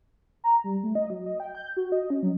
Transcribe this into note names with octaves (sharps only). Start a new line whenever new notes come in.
A#5
G3
A3
D#5
F#3
D#5
G5
G6
F#4
D#5
C#4
F#3